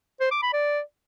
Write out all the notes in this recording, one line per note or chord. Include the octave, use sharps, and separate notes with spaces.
C5
D6
B5
D5